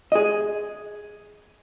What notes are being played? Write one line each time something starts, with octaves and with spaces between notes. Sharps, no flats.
G#4 D#5